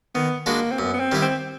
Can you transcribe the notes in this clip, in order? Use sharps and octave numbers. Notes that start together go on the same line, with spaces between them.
D#3 B3
G#3 A#3 B3 D4 F#4
C4
F#2 B3
B3
C4
D#3 G3 B3 E4
C4